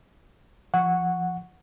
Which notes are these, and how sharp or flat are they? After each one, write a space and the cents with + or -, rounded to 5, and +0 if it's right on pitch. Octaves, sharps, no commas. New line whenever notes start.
F3 -15 F#5 -5 C#6 +0